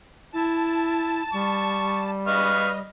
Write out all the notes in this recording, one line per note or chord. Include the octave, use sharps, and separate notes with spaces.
E4 A5
G3 C#6
B4 D#5 F5 C#6